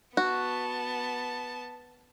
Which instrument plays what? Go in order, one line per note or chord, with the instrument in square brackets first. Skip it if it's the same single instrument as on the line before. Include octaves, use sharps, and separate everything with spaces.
[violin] B3 A5 [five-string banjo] F#4